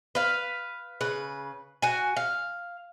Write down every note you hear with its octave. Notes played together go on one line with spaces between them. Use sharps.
B4 F5
C#3 B4
F#4 G#5
F5